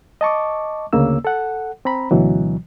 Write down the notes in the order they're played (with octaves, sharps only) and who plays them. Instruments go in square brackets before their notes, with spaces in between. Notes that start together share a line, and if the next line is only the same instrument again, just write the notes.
[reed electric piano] D#5 A5 C#6 D6
D2 C#3 A#3 C#4 E6
A4 F#5
C4 A#5 B5
D2 B2 E3 F#3